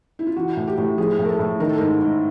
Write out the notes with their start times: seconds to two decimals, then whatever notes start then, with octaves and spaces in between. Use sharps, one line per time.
0.19 E4
0.27 F4
0.36 E3 F#4
0.57 A2
0.67 G4
0.78 A2
0.98 F3 G#4
1.19 A2
1.25 A#4
1.29 A4
1.39 A2
1.60 D#3 A#4
1.69 A4
1.78 G#2 A#4
2.02 G#2